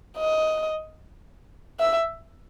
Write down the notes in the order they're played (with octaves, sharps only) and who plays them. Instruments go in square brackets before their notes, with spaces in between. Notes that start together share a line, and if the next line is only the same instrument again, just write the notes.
[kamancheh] D#5
E5